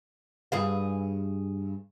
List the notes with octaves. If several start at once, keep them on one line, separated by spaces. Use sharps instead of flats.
G2 G#4 F5